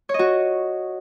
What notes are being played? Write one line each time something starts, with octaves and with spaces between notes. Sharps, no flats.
C#5
D#5
F#4